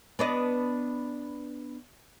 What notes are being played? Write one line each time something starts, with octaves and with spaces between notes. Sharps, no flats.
B3 D4 D#5